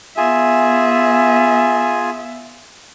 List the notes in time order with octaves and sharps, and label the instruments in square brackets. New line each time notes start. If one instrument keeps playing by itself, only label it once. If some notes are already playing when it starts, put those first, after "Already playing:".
[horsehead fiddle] B3 E5 [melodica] F4 G#4 G#5